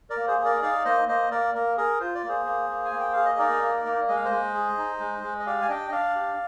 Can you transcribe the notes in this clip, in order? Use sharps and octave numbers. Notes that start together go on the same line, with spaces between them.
A#4 D5
A#3
G#4 C5
G#4
A#4 D5
D#4 D5 F5
A#3 C5 D#5
A#3 C5 D#5
A#3 A#4 D5
A#3 A#4
G#4 A#4
F4 C5
D5
A#3 G#4 C5
A#3
A#3
G#5
A#3
G5
G#4 F5
D#5
D#4 A#4 D5
A#3
A#3
G#3 D#5
F5
C5 D#5
G#3
G#4
D#4
G#3
G#3
D#5
G4 D5 F5
G#5
D4 D#5 G5
D#5
D4 D5 F5
G4